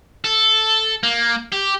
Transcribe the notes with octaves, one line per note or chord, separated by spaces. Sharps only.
A4
A#3
G4